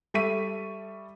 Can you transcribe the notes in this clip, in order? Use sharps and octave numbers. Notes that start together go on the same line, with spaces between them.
G3 A4 E5 C#6 B6 D#7